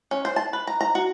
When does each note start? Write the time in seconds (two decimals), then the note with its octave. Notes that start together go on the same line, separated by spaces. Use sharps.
0.11 C#4
0.25 C5
0.36 A5
0.53 B4
0.67 A#5
0.81 A#5
0.95 F#4